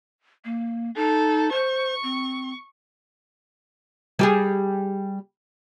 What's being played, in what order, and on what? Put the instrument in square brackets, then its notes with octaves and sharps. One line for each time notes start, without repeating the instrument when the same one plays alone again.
[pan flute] A#3
[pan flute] D#4 [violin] A4
[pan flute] C5 [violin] C#6
[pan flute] C4
[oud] G3 G4 G#4